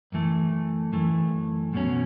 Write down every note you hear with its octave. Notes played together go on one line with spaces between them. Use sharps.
F#2 E3 A3
F#2 E3 A3
B1 B2 F#3 C#4